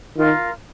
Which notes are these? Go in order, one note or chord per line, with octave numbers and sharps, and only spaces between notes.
D#3 F4 A#4 F5